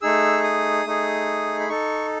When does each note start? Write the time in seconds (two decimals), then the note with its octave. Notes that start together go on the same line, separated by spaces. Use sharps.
0.02 A3 D#4 G#4 E6
0.43 D#6
0.85 A3 D#4 G#4
1.60 B5
1.69 D#4 A4 C#6